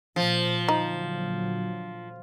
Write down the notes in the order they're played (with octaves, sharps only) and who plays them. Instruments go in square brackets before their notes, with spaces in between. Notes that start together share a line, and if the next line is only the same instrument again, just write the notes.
[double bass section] A#2 [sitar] F3
[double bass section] A#2 D3 F#3 [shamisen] D#4